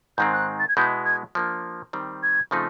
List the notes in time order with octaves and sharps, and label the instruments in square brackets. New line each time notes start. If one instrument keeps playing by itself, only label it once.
[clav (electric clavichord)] G#2 D#3 G#3 C4 [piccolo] G6
[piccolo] F#6
A6
G#6
[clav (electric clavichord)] B2 G#3 B3 E4 [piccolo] G6
[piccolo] G#6
[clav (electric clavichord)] F3 A#3 D4
D#3 G3 C4
[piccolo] G#6
[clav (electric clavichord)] C#3 F3 A3 C4 D#4